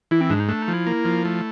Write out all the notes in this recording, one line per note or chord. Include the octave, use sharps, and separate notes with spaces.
E3 E4
C4
G#2 D4
D#4
A3 D4
D#4
F3
E4
A#3
F3
A3